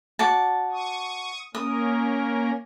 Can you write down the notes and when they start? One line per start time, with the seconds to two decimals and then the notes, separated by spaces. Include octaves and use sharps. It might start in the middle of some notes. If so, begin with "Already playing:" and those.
0.19 F#4 D5 A5
0.72 C#6 D#6
1.55 A#3 C#4 A#4 D#6